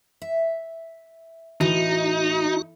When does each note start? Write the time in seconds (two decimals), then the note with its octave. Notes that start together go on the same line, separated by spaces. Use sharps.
0.22 E5
1.61 A2 E3 D#4 F#4